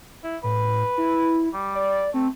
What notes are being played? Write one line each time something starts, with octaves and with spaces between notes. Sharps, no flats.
E4
A2 B4
E4
G3
D5
A3 C4